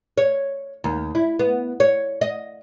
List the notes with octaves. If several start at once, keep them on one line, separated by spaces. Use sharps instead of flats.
C#5
D#2
E4
B3
C#5
D#5